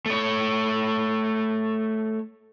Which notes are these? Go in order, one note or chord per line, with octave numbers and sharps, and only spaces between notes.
A3 C#5